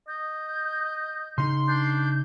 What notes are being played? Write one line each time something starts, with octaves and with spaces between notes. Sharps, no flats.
D#5 G6
C#3 D#4 C6
D4 G6